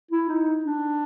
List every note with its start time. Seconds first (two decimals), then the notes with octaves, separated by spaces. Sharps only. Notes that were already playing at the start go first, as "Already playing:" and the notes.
0.11 E4
0.29 D#4
0.65 D4